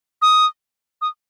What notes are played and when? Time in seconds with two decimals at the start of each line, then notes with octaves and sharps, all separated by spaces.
0.22 D#6
1.01 D#6